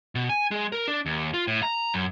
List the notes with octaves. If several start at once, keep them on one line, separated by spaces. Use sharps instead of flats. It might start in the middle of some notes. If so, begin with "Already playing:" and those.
B2
G#5
G#3
A#4
D4
D#2
F4
A2
A#5
F#2